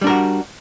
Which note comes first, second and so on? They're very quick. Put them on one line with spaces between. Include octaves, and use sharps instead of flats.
G3 D4 A#4 F#4